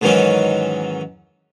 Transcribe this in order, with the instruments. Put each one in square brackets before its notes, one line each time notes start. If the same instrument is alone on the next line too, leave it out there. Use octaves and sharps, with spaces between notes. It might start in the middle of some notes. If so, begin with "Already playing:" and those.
[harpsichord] G#2 D#3 E3 F#3 C#4 D#4